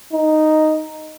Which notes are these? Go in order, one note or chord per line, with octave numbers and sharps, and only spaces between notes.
D#4